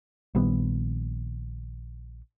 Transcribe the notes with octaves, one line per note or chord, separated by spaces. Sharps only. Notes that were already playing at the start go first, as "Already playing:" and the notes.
A#1 D#3 G3 B3